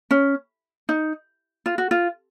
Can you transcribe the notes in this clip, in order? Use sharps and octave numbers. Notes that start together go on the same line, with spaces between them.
C#4
D#4
F4
F#4
F4